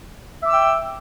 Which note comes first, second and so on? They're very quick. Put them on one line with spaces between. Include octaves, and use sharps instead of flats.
E5 D6 E6 G5